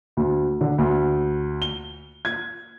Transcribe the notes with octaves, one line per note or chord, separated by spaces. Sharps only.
D2
D3
D2
G7
G#6